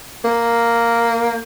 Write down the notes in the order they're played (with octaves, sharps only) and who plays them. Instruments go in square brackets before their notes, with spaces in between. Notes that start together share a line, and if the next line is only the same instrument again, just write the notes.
[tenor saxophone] A#3